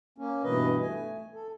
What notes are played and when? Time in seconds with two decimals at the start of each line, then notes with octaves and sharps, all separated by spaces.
0.18 A#3 C#4
0.44 G2 B2 E3 B4 D#5
0.81 A3 G#5
1.34 A4